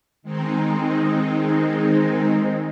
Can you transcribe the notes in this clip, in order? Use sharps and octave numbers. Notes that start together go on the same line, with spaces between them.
D#3 G#3 C4 D#4